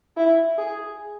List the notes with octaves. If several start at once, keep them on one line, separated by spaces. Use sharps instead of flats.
E4
G#4